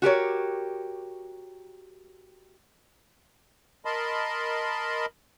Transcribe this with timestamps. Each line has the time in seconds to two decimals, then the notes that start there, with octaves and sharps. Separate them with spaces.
0.02 F#4 G4 A#4 C#5
3.85 A#4 D#5 A5 B5 C6